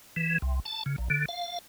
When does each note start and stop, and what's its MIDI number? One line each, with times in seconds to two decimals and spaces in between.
0.16 0.38 52
0.42 0.60 36
0.65 0.83 81
0.86 0.96 49
0.98 1.08 34
1.10 1.25 50
1.29 1.59 77